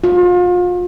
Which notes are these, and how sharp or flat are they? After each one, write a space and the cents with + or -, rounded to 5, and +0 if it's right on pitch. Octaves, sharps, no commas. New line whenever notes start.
F4 +35